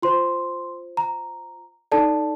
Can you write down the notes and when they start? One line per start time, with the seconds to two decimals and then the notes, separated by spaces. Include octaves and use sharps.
0.02 F4 C5 C6
0.97 A#5
1.92 D#4 A4 D5 A5